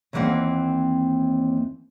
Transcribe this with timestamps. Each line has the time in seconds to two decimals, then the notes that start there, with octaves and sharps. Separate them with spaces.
0.13 D#2 E3 F#3 A#3 C4 F#5